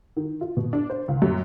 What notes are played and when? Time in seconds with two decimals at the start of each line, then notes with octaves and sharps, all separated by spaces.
0.17 D#3
0.41 F4
0.57 B2
0.73 D4
0.90 C5
1.08 C#2
1.22 F#2